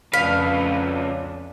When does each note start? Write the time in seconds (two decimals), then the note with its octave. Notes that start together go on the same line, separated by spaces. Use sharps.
0.14 F2 C#3 D4 B4 F5 B6